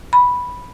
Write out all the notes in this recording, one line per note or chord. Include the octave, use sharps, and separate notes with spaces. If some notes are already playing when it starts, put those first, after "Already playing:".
B5